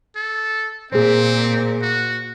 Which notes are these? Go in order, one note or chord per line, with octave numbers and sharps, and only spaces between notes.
A4
A#2 C4 G#4 C5
F#4